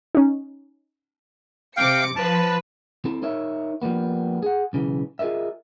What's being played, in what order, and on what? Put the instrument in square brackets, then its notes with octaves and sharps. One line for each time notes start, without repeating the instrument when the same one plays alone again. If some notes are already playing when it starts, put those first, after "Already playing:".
[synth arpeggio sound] C#4 D#4
[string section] C3 D6 C#7 [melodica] F5 G5
[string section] F3 B4 [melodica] A5
[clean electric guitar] C4 E4 A4
D#4 A#4 C#5 E5
F3 G3 A#3 B3
G#4 F#5
B1 C#3 E3
F4 G#4 A#4 D#5 E5